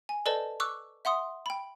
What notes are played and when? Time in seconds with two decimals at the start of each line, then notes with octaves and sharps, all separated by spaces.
0.09 G#5
0.26 A4 B4 C5 D5 D#5 A5
0.60 C#6 D6 E6 F#6
1.05 E5 F#5 C6 D#6
1.46 G5 B5